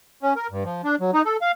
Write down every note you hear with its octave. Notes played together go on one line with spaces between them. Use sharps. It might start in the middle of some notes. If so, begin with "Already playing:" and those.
C#4
A#4
G2
F3
D4
F#3
D#4
A4
F5